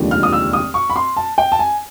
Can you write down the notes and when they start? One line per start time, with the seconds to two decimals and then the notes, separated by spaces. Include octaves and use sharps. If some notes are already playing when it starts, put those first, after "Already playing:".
Already playing: F1 D#2 D3 F3 G#3
0.11 F6
0.23 D#6
0.33 E6
0.53 D#6
0.74 C#6
0.90 B5
0.96 C6
1.17 A5
1.38 G5
1.52 A5
1.59 G#5